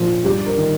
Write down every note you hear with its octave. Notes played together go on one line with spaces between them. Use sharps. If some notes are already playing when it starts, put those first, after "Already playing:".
Already playing: A#2 F3 F4
G2 G4
A#4
D#3